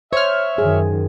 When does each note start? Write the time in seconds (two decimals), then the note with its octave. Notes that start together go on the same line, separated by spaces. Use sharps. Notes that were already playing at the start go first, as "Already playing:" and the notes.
0.13 C5 C#5 E5 F6
0.58 F#2 D#3 G#4